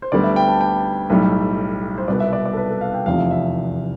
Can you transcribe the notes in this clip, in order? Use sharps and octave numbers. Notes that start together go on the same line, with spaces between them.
C5
D2 D3 G3 B3 D5
E5
G5
A5
G5
B1 A2 G3
C5
C2 B2 B3 D5
E5
D5
D5
A4
B4
A4
F5
G5
F1 E2 C3 F3 F5
E5
E5